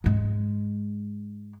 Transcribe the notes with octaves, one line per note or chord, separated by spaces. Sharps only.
G#2 G#3